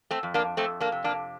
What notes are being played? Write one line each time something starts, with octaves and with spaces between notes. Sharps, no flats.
A3 C4
F2
A#3 D4
F2 A3 C4
A#3 D4
C3
A#3 D4